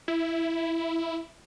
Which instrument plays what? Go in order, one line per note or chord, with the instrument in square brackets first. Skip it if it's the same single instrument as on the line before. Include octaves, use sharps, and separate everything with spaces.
[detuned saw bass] E4